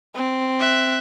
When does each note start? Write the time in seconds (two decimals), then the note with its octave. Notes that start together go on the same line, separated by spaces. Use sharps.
0.15 C4
0.60 E5 F#6